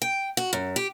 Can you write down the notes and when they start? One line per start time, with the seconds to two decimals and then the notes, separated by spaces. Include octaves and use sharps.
0.02 G5
0.37 F#4
0.53 F#2
0.76 G4